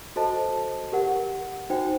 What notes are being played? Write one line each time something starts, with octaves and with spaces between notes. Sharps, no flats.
F#4 A4 C5 D#5 A5
G4 A#4 F#5
D#4 F#4 C5 G5